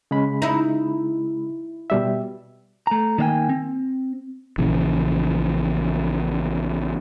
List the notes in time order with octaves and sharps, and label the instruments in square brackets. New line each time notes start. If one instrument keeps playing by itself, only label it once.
[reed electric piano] C#3 G#3 B5
[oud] D#4 E4
[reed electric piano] B2 G3 E5
[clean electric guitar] A3 A#5
D#3 A#3 D5 F5 G5 G#5
C4
[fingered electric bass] A#1 A#2 C#3 E3